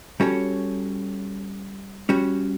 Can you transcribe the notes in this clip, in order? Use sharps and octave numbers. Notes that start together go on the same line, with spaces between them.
G3 C#4 F#4 A4 C#5
G3 C#4 F#4